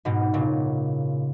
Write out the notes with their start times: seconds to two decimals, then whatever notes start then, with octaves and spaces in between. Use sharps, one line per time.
0.05 G#2 B2
0.34 A#2 C#3